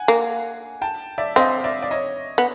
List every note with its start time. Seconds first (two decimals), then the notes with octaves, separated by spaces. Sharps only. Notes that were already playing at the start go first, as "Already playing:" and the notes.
Already playing: F#5 G#5
0.08 A#3
0.82 G5 A5
1.18 D5 E5
1.36 C4 D#5 F5
1.64 D5 E5
1.82 D5
1.91 C#5 D#5
2.38 B3